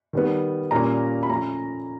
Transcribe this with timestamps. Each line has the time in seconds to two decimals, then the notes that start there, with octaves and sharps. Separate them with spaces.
0.13 D#3 G3 B3
0.71 A#2 G3 A#3 C#4 A#5
1.23 B5
1.29 F3 A3 C#4 A#5